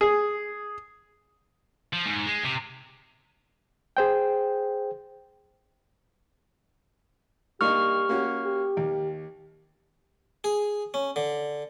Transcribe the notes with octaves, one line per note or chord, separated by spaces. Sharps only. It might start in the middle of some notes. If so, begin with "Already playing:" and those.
G#4
F3
G#2
G#3
C3
G#4 C5 G5
G2 A#3 D#4 G4 C#6 F6
A#3 C#4 F#4
G4
D#2
G#4
C#4
D3